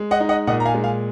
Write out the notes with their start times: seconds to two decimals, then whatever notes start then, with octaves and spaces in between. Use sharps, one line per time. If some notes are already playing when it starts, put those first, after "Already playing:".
Already playing: G#3
0.11 D#5 F#5
0.20 D#4
0.29 D#5 F#5
0.47 A#2 D#5 F#5
0.60 A#5
0.65 F5 G#5
0.75 G#3
0.83 F5 G#5